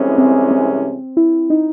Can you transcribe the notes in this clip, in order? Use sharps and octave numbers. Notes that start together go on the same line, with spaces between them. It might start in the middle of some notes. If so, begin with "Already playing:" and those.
Already playing: C2 C3 E3 G#3 C#4
C4
C4
E4
D#4